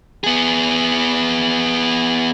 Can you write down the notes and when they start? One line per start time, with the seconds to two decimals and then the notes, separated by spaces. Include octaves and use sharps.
0.24 B3 G#4